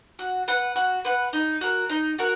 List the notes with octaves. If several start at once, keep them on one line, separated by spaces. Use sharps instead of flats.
F#4
B4 F#5
F#4
B4 F#5
D#4
F#4 A#4
D#4
F#4 A#4